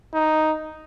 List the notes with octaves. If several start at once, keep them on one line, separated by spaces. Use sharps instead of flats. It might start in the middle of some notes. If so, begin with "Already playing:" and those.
D#4